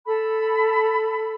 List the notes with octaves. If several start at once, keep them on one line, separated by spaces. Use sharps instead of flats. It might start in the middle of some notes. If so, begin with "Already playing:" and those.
A4 B5